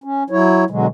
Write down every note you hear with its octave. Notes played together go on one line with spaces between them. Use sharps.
C#4
F#3 E4 C#5
B2 D3 F#3 G#3